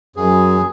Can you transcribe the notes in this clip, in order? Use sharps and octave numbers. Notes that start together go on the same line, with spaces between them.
F#2 G#4